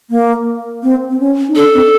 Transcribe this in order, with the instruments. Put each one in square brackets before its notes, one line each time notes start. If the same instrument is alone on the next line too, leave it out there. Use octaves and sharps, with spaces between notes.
[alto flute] A#3
C4
C4
C#4
D#4
[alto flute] D4 [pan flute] A4
[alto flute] C4